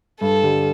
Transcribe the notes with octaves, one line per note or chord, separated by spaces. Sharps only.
G2 A4
D3 G3